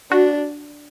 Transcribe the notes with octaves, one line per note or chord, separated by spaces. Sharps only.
D4 F#4